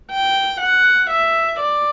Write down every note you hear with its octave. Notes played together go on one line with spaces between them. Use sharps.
G5
F#5
E5
D5